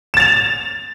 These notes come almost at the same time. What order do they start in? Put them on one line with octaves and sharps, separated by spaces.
E7 A6 F7